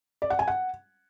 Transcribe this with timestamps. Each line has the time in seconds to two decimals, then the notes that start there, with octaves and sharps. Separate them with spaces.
0.22 D5
0.30 F#5
0.39 G#5
0.48 F#5